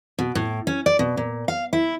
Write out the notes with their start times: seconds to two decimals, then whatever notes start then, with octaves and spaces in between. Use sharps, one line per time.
0.19 B2
0.35 A2
0.67 C#4
0.86 D5
0.99 B2
1.17 A#2
1.48 F5
1.73 E4